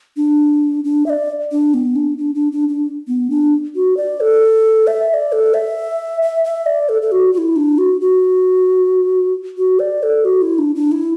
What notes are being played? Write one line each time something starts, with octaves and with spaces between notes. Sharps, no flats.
D4
D4
E5
D5
D4
B3
D4
D4
D4
D4
D4
B3
D4
F#4
D5
A4
E5
E5
D5
A4
E5
E5
E5
D5
A4
A4
F#4
F#4
E4
D4
F#4
F#4
F#4
D5
A4
F#4
E4
D4
D4
E4